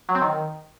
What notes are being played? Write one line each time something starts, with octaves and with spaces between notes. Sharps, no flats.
F#3
C4
D#3